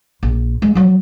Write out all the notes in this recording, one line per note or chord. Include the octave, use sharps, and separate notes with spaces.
A#1
G#3
F3 F#3